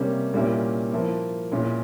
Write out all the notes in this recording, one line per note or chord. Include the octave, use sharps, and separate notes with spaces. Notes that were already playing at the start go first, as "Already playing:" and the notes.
Already playing: C3 G3 A#3 C#4
A#2 G3 A#3 C#4 E4
F3 A#3 E4
A#2 G#3 C#4 E4